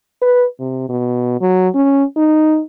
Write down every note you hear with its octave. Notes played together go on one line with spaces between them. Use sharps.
B4
C3
B2
F#3
C#4
D#4